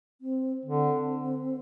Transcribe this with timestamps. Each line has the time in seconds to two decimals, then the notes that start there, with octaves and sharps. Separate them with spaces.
0.21 C4
0.65 D3 C4